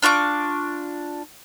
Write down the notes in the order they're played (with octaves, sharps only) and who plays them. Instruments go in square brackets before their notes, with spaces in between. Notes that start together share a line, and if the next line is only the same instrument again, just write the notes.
[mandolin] D4 F4 C#6 D6